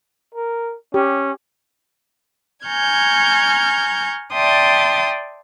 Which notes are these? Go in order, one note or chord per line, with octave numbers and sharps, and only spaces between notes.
A#4
C#4 G4
G#5 A#5 C#6 F6 G6 G#6
D5 E5 G5 A5 C6 D#6